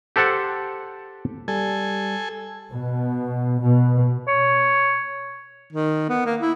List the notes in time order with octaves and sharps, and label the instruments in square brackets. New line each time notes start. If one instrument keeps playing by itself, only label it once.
[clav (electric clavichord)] G4 A4 C5 F#5 A5
[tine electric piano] G3 [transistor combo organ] A4 G#5
[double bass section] B2
B2
[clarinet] C#5
[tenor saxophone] D#3
B3
A#3
E4